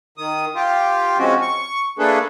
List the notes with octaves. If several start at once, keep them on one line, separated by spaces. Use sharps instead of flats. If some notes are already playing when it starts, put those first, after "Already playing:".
D#3 D#6
F4 G4
F3 G#3 C4 C#4 F#4
C#6
A3 A#3 D4 G#4 A4 B4